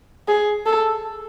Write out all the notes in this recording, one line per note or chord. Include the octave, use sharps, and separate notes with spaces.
G#4
A4